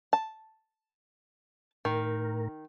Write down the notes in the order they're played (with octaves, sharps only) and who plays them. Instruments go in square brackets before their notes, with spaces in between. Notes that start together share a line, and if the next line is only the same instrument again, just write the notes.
[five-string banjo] A5
[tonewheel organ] A2 A#4 [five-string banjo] D#3